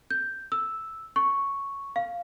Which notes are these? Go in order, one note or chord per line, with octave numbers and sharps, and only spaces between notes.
G6
E6
C#6
F5